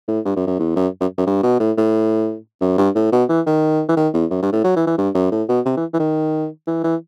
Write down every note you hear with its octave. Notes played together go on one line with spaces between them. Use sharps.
A2
G2
F#2
F#2
E2
F#2
F#2
F#2
G2
B2
A2
A2
F#2
G2
A2
B2
E3
D#3
E3
D#3
E2
F#2
G2
A2
F#3
E3
E3
G2
F#2
A2
B2
C3
E3
E3
D#3
E3
E3